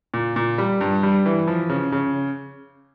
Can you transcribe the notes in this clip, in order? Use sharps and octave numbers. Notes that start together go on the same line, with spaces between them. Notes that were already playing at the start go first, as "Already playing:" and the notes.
A#2
A#2
G3
G2
G3
E3
F3
C#3
C#3